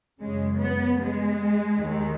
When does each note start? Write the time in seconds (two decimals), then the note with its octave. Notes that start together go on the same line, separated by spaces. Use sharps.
0.21 F#2 C#3 G#3
0.60 B3
0.99 G#3
1.78 D#2 D#3